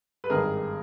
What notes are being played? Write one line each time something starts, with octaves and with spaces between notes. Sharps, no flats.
B4
G#1 G2 D#3 G#4 A#4